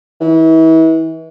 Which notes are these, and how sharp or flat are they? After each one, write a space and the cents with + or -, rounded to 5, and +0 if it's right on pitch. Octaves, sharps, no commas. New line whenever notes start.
E3 -35